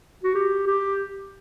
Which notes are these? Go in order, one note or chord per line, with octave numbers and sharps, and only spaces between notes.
F#4
G4
G4